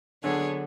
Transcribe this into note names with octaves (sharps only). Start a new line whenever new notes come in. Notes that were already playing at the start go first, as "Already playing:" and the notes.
D3 F#3 B3 D4 G#4 C#5